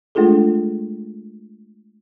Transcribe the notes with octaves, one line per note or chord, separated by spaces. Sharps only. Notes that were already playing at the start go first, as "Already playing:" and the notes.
G#3 A3 D4 F4 G#4 A4